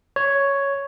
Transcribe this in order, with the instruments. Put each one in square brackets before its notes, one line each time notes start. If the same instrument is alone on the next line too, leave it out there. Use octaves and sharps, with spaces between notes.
[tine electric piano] C#5